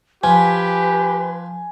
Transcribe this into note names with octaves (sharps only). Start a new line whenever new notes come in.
F3 G4 B4 G#5